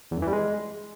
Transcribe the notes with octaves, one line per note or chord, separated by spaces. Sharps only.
E2
F#2
E3
G3
G#3